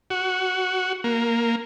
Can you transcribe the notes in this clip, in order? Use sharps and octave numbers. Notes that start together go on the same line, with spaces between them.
F#4
A#3